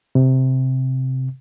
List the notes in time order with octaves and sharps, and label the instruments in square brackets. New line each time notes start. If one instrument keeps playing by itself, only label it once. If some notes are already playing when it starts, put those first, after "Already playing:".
[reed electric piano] C3